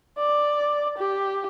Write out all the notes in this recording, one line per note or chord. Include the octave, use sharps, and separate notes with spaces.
D5
G4